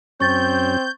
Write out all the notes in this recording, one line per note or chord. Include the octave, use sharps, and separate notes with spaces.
F#2 C4 C#4 C#6 G6 A6